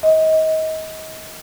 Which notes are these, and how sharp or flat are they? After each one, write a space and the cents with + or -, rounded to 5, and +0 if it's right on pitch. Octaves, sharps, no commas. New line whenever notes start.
D#5 +30